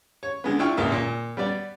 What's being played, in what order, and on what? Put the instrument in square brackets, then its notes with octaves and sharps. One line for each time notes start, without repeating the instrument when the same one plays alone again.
[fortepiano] C#5
D3 G#3 B3
D4 E4 F4 G5 C#6 F6
G#1 C#2 A#3 E5
A#2
G3 B3 D5